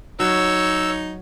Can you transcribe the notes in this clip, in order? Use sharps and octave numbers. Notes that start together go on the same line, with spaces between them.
F#3 D#4 C#5 E6